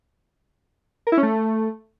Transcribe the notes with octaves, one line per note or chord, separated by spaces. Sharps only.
A#4
E4
C#4
A3